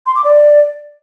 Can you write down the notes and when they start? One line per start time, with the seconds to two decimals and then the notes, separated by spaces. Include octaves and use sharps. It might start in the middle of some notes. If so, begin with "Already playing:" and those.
0.06 C6
0.15 D6
0.24 D5